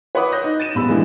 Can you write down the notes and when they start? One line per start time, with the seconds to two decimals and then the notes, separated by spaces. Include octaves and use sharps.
0.15 B4 C#5 F#5 B5 D6 D#6
0.32 D#6 F#6 G6 A#6
0.44 D#4
0.60 A6 D#7 E7
0.75 D#1 E2 B5 E6
0.89 G2 A#2 D3 E3 F3 G#3